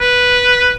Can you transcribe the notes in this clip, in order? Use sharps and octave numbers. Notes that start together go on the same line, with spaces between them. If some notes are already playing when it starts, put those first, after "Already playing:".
B4